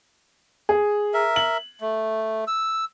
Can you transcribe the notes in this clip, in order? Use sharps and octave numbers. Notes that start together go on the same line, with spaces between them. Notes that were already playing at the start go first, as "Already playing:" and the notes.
G#4
A#4 E5
F#7
A3
E6